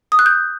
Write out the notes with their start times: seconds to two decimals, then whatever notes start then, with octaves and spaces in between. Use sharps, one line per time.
0.12 D#6
0.19 F#6
0.26 G6